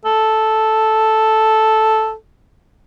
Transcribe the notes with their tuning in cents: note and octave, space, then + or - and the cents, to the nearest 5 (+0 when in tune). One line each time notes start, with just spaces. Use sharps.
A4 -5